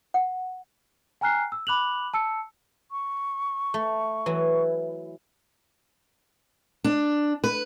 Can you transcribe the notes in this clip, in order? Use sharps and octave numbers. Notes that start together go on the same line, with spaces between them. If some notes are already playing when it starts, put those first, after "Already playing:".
F#5
G5 G#5 A#5 F6 F#6 C7
E6
B5 D6 F#6 F7 F#7
A5 E6 C#7
C#6
A3
E3 F#3 E4
D4
B4